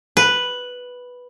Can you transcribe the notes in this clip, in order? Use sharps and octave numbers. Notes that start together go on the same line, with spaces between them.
B4